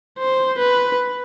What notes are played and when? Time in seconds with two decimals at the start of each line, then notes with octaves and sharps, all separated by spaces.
0.18 C5
0.59 B4